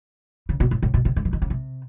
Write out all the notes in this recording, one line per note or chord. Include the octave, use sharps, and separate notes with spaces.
C#3
B2
A2
A2
B2
C3
D3
E3
D#3
C#3
C3